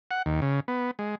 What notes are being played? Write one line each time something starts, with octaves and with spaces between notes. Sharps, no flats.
F#5
D#2
C#3
B3
G#3